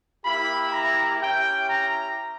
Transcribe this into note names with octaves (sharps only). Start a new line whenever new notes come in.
A#3 E4 G4 B5
A#5
C#4 E4 G4 G5
A#5